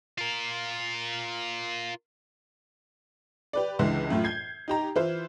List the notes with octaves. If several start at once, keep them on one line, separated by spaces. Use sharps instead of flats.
F4 A#4
G4 B4 D5
C#2 D3 E3 G#3
F#2 A2 A3 F4
G6 G#6 C7
D#4 G4 A#5
E3 E4 F4 C5